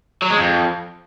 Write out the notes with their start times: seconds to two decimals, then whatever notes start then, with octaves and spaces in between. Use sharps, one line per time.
0.22 F#3
0.30 G#3
0.38 F2